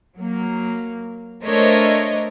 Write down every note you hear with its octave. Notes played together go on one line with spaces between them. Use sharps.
F#3 A#3
A3 D4 A#4 C5 C#5 D#5